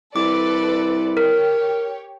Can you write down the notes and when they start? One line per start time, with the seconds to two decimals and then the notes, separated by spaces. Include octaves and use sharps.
0.16 C2 A4 B4 D5 D6
1.17 G4 A#4 C#5